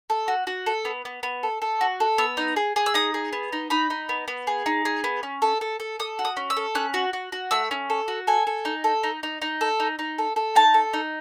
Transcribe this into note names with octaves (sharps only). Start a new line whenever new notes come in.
A4
F#4
F#4
A4
B3
B3
B3
A4
A4
F#4
A4
B3 E6
D#4
G#4
G#4
E6
D#4 D#6
G#4
B3
D#4
D#4 B5
D#4
B3
B3
G#4
D#4
G#4
B3
C#4
A4
A4
A4
A4 D#6
F#4
D#6
C#4
E6
A4
C#4 F#6
F#4
F#4
F#4
A3 E6
C#4
A4
F#4
A4 G#5
A4
D#4
A4
D#4
D#4
D#4
A4
D#4
D#4
A4
A4
D#4 A5
A4
D#4